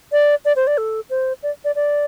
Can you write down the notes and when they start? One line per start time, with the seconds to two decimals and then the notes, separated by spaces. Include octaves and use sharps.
0.12 D5
0.45 D5
0.56 C5
0.67 D5
0.78 A4
1.10 C5
1.43 D5
1.65 D5
1.75 D5